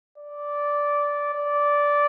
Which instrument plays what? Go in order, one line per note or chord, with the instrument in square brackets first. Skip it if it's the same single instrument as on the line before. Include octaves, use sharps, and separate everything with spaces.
[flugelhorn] D5
D5